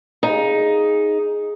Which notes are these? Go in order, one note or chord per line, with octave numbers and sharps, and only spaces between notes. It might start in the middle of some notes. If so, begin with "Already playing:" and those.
D#4 G#4 F5